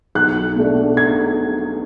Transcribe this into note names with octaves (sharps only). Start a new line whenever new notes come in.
B1 F#6
B2 A3 D4
G#6